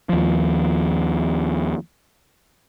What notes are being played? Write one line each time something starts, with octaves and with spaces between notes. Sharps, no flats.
D#2 F3